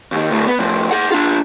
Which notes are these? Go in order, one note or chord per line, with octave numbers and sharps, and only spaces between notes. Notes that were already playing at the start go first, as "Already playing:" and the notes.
D#2 D#3
D2 A2
B3
A2 F3
G#4 F#5
D4 F4